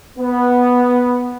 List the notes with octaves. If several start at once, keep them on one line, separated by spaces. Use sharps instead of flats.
B3